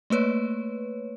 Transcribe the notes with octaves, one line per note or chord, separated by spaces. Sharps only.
A3 A#3 B4 C#5